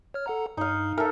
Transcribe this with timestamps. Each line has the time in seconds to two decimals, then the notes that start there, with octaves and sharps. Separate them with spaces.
0.14 C#5 F6
0.26 A4 F#5 A#5
0.57 G2 D#4 F5
0.98 A4 A#4 E5